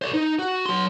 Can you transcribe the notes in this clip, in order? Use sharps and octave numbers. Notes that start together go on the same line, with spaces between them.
C5 D5
D#4
F#4
F#3 C6